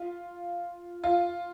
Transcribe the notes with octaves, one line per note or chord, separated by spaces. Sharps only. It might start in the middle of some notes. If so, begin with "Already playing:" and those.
Already playing: F4
F4